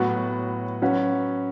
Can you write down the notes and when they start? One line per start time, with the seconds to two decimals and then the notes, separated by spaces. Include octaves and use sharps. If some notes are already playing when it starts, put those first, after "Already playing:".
Already playing: A2 F#3 B3 F#4
0.82 F#3 C#4 F#4 B4